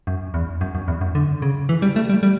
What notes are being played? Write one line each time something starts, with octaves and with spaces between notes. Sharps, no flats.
F#2
E2
F#2
F#2
E2
F#2
D3
C#3
E3
G3
A3
G3
G3